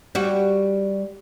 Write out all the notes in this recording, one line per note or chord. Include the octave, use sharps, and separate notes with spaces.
G3 F#4